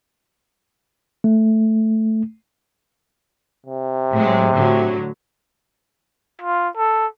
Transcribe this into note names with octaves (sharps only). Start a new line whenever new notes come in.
A3
C3
A2 F#3 G#3
A2 D3 F#3
F4
A4